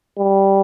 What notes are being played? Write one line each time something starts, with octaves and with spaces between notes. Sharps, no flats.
G3